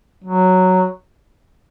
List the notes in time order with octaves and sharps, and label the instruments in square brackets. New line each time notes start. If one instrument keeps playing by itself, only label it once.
[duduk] F#3